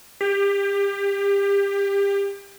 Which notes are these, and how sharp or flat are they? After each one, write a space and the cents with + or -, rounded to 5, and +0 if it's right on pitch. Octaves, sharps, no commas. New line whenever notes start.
G4 +30